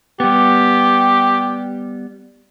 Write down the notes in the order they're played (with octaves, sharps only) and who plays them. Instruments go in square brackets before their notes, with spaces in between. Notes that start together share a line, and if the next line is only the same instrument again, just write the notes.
[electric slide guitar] G3 B3 [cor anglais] G4